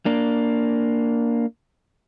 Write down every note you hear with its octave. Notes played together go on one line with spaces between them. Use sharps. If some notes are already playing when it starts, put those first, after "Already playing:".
A#3 D4